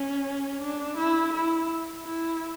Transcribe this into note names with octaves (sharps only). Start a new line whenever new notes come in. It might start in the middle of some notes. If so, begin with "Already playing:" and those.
Already playing: C#4
D4
E4
E4
E4